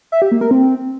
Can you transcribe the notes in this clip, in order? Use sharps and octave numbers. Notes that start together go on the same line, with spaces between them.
E5
G4
A#3
A#4
C4